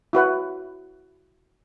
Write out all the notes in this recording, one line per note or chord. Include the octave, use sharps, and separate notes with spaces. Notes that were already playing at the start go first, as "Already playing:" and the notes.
E4 F#4 B4 F#5